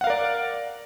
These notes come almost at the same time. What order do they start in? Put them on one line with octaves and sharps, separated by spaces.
F#5 F5 A#4 D5